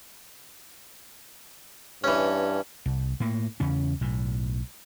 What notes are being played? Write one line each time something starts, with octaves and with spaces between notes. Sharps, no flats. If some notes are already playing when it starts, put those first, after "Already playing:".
G2 E3 C#4
C2
A2 A#3
E2 C#3 C#4
B1 A2